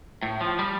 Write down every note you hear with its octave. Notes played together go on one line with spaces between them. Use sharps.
A2
F3
G3